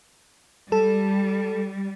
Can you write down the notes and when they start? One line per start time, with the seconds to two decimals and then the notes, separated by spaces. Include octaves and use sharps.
0.72 G3 A4